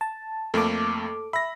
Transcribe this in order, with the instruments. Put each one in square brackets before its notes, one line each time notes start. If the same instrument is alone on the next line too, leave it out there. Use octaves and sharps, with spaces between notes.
[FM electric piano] A5
[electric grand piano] F2 A3 A#3 [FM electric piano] A4 D6
[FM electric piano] E5 [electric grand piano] B5 A#6